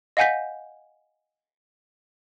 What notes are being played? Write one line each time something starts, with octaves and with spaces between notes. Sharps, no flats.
D#5 F5 F#5 G#5 G6 B6